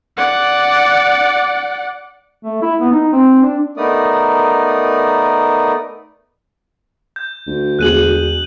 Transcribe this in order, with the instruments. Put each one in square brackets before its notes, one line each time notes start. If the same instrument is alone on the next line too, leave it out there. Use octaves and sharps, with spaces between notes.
[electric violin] D5 F#5
[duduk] A3
E4
B3
D#4
C4
D4
[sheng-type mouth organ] A3 B3 D#4 A#4 D5 D#6
[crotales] G6
[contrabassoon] D2
[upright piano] E1 G#4 [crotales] F#6 D#7 F#7